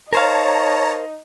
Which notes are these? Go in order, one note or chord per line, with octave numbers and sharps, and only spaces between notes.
D#4 A#4 C5 C#5 F5 A5 A#5